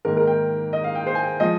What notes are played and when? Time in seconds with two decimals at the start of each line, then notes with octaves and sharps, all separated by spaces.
0.05 G#2 D#3 A#3 A#4
0.17 A#4
0.27 G5
0.73 D#5
0.84 F5
0.95 G5
1.06 C5
1.15 G#5
1.23 G5
1.40 F3 G#3 D#5